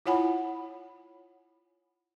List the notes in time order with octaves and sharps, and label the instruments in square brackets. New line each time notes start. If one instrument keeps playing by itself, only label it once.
[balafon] E4 F4 C#5 F#5 G#5 B5